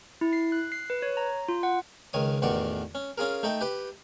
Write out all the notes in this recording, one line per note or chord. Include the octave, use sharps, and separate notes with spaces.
E4
C7
F#6
C7
B4
C#5
A#5
F4
F#5
C#2 D#3 C#5 D#6
A1 E2 D#3 F#4 D5 C#6
C#4
C#4 F4 G#4 A#4
A3 D#4 A4 G5
G4 B4 G5